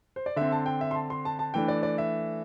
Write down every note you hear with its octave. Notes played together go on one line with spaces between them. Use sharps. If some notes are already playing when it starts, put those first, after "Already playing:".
C5
D5
D3 C4 E5
A5
G5
E5
C6
A5
C6
A5
A5
E3 A3 D4 G5
D5
D5
E5